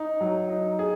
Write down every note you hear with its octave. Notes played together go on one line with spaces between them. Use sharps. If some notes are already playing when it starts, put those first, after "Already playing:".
Already playing: D#4
F#3
D#4
G#4